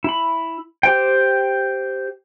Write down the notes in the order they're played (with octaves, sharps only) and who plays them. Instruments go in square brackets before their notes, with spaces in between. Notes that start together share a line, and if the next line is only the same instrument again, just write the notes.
[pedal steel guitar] E4 B5
G4 C5 G5